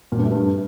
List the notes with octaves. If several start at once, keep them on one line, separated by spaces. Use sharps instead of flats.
A#2
G2
A3
G2